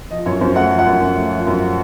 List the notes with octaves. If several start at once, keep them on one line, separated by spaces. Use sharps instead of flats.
F3 D#5
F#2 C#5
F#2 C5
A3 F#5
F3
F#5
F#2
F#2
A3
F3
F#2